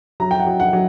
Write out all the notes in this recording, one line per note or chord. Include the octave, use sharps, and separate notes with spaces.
F#3 A#5
G5
F#5
F#3
F#5
F#3